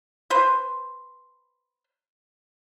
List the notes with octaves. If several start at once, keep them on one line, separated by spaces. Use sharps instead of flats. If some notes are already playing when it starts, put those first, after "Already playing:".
B4 C5